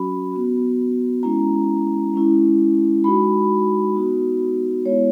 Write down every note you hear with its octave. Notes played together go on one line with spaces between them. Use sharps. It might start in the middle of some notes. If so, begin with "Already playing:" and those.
Already playing: F#3 C#4 F#4 B5
B3 F#4
G#3 C#4 E4 A#5
G#3 C#4 E4
G#3 D#4 F#4 B5
B3 D#4 F#4
G#3 B3 E4 C#5